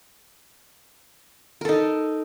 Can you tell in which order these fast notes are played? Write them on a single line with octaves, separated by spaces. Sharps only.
A#4 A4 D#4